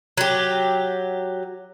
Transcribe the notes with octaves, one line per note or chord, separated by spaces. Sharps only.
F#3 G4